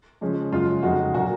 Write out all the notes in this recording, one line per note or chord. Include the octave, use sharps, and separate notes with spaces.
C#3 F3 G#3 C#4
F#2 C#3 G#3 F4
F2 C#3 G#3 D#4 F#4
A#2 F#3 A#3 F#4